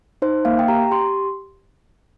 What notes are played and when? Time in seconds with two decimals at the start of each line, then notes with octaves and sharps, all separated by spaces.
0.22 D#4 C5
0.45 A#3 F5
0.59 G5
0.68 G4 A#5
0.91 G4 C6